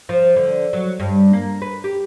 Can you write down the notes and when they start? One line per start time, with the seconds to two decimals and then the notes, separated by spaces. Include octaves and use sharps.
0.09 F3
0.36 D3
0.73 F#3
1.00 G2
1.33 A#3
1.62 B4
1.84 G4